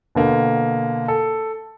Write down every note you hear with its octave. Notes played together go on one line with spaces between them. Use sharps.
B2 D3 A#3
A4